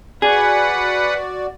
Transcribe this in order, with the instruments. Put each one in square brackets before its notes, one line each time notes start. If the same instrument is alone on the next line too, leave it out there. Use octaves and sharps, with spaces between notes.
[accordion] F#4 D5 [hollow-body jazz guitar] G#4 [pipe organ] B4 F#5